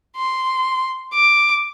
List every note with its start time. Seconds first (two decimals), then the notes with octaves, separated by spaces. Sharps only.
0.16 C6
1.14 D6